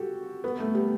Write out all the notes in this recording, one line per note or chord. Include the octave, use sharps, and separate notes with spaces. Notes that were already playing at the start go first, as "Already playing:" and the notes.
Already playing: F#4 G4 A4
B3
A3
G3